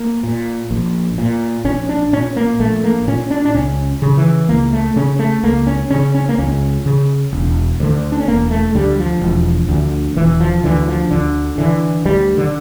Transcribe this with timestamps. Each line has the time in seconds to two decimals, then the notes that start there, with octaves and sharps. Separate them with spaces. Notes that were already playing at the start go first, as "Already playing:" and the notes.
Already playing: A#3
0.23 A#2
0.71 A#1
1.18 A#2
1.65 A#1 C#4
1.89 D4
2.13 A#2 C#4
2.36 A#3
2.59 A#1 A3
2.84 A#3
3.07 A#2 C#4
3.30 D4
3.45 D4
3.54 C#2 C#4
4.02 C#3
4.17 E3
4.49 C#2 A#3
4.73 A3
4.96 C#3 C#4
5.19 A3
5.43 C#2 A#3
5.67 C#4
5.90 C#3 C#4
6.15 C#4
6.29 A#3
6.38 C#2 C#4
6.86 C#3
7.33 E1
7.80 D2 D3
8.12 D4
8.20 C#4
8.27 E1 A#3
8.51 A3
8.74 D2 D3 G3
8.99 F3
9.22 E1
9.69 D2 D3
10.16 E1 E3
10.41 F3
10.64 D2 D3 E3
10.88 F3
11.11 D2 D3
11.58 D3 E3
12.05 D2 G3
12.38 D3